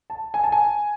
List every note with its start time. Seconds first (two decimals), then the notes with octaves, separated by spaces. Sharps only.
0.10 A5
0.34 G#5
0.44 A5
0.52 G#5